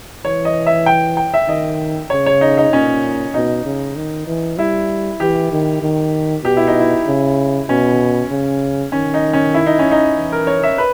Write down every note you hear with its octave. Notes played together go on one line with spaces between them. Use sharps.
E3 C#5
D#5
E5
G5
G5
E5
D#3 D#5
C#3 C#5
C#5
D#4
D#4
A#2 C#4
B2 D#4
C#3
D#3
E3
G3 E4
E3 G4
D#3
D#3
B2 G4
E4
D#4
E4
C#3
B2 C#4
C#3
D#3 C#4
D#4
C#4
E4
D#4
C#4
D#4
E3
A#4
C#5
E5
B4